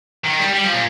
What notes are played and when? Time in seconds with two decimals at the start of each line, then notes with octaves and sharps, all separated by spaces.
0.24 D#3
0.39 G3
0.53 G3
0.64 F3
0.73 A#2